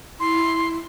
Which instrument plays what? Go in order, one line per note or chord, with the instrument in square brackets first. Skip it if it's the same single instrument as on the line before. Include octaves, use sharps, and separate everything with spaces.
[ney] E4 [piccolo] C6